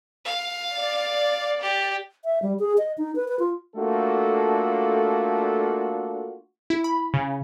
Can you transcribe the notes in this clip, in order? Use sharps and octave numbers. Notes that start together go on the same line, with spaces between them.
F5
D5
G4
E5
G3
G#4
D#5
D#4
B4
B4
F4
A3 A#3 D4 F4 F#4 A4
E4
B5
C#3